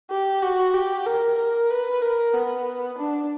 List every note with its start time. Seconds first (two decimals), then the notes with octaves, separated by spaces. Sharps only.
0.10 G4
0.42 F#4
0.74 G4
1.06 A#4
1.38 A#4
1.70 B4
2.02 A#4
2.34 B3
2.98 D4